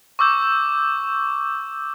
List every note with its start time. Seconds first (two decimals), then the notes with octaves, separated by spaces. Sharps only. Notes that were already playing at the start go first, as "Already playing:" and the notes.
0.19 C#6 D6 E6 G6